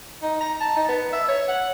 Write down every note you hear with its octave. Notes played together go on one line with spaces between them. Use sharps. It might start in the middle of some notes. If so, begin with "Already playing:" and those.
D#4
A#5
A5
D#4
B3
E5
C#5
F#5